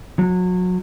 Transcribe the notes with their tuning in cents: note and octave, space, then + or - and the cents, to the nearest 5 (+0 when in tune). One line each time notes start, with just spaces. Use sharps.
F#3 -25